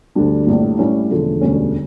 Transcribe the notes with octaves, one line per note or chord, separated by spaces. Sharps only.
D2 D3 G3 D4
A#1 A2 G3
A2 G3 C#4 E4
E1 E2 D3 F3 A3
E1 D2 D3 G3 C#4